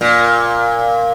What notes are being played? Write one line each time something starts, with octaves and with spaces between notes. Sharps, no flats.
A#2